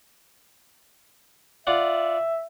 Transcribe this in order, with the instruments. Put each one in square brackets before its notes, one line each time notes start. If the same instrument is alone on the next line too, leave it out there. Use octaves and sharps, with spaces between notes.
[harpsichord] F4 D5 F#5 [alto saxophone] E5